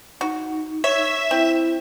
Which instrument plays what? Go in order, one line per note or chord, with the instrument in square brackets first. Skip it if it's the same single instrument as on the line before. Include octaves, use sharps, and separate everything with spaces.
[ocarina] D#4 [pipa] F#4
[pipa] C#5 [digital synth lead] E5
[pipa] C4 [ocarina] E4